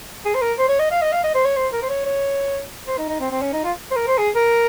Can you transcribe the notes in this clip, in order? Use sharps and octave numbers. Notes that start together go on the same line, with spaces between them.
G#4
C5
A#4
C5
C#5
D#5
F5
D#5
F5
D#5
C5
C#5
C5
A#4
C5
C#5
C#5
C5
D#4
D#4
C4
C4
C#4
D#4
F4
C5
A#4
C5
G#4
A#4